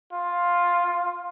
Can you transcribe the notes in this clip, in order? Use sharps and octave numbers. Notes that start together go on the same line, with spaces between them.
F4